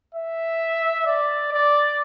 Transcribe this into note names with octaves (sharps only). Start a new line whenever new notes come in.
E5
D5
D5